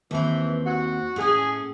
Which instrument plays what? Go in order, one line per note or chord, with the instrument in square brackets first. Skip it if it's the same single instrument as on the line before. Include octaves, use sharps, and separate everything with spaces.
[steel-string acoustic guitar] D#2 C4 [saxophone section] E3
[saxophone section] F#4
[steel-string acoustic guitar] A2 C#4 [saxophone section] G#4